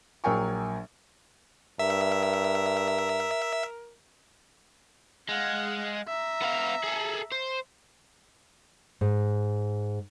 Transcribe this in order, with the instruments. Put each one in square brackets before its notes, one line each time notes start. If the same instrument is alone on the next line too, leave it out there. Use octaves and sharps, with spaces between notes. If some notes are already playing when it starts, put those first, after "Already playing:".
[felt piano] A#1 F#3 A#4 G5 G#5 C#6
[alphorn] G2 [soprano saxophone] A#4 [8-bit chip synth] E5
[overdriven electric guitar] G#3 [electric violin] F5 F#5
[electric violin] E5 A#5
[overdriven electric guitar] B3 F5
G#4 A4
C5
[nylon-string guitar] G#2